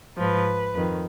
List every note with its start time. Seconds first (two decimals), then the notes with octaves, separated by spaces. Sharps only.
0.17 G#2 F3 B4
0.74 F2 D#3